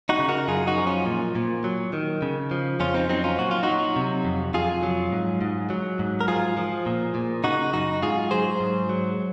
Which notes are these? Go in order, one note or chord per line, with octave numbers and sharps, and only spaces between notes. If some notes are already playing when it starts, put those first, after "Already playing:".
D#4 F#4
C#3
F#4 A#4
F#2 F4 G#4
D#4 F#4
F3
C#4 F4
A#2
A#2
F#3
D#3
C#3
F3
F2 C#4 F4
C4 D#4
F#3 C4 D#4
C#4 F4
A#2 F#4
F4
F#3 D#4 F#4
C3
F2
F2 F4 G#4
F#3
G#2
G#2
F#3
G#2
A#4
F3 F4 G#4
F3
A#2
A#2
C#3 D#4 F#4
F#2 D#4 F#4
G#2 F4 G#4
F#3 G#4 C5
G#2
F#3